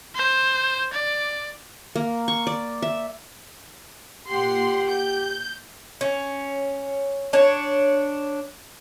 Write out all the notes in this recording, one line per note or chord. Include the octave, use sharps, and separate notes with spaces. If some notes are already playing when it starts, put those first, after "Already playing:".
C5
D5
A#3
C#6
D5
E5
A#2 G4 F#5 C6
G6
C#4
D4 C#5